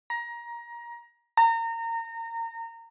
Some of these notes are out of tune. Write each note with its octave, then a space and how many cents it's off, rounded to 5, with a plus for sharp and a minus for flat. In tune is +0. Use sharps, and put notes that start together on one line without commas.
A#5 +25
A#5 -25